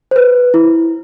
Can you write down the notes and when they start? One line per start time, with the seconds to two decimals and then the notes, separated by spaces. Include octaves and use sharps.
0.11 C5
0.16 B4
0.54 E4